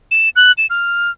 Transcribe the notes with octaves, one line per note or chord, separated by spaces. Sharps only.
E7
F#6
E7
F6